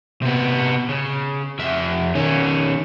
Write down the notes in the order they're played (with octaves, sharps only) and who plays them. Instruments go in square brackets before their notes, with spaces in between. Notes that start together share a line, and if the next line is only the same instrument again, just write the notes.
[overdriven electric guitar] C3 B3
C#3
F2 E5
D#3 C#4